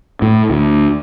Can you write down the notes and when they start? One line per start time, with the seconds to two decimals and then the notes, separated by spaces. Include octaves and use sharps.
0.22 A2
0.50 D2